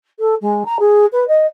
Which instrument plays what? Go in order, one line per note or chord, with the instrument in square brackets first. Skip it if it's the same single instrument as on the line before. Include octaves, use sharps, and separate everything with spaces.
[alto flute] A4
G#3
A#5
G#4
B4
D#5